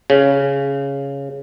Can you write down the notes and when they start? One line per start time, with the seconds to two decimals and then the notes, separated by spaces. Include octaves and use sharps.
0.10 C#3